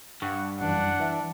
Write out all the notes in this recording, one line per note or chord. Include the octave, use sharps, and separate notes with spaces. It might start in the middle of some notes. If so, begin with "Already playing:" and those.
G2 F#5 C#6
A#1 F#2 E3 D4 F#5
E3 E5